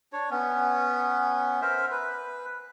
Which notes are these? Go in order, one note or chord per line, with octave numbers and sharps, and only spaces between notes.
D4 C#5
B3 C#4
A#4 C5 E5
B4